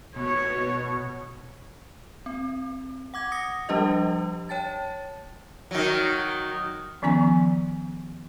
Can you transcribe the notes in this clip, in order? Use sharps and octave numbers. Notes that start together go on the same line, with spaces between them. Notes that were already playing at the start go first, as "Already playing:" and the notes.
B2 C#5
C4
F#5 D6 G#6
D#6 A#6 C#7
F3 G3 D4 G4 D#5
C#5 G5 A5 A6
D#3 F#3
D#3 F3 B3 C#4 G#5 C#6